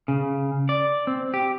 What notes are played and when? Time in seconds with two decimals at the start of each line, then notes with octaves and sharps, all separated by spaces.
0.08 C#3
0.69 D5
1.07 C4
1.34 G4